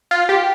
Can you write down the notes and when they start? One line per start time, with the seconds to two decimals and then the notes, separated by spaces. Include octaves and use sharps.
0.11 F4
0.29 G4